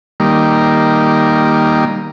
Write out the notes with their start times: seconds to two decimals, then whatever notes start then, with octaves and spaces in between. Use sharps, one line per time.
0.20 D#3 G3 A#3